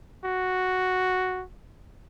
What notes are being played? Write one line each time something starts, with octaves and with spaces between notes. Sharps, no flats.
F#4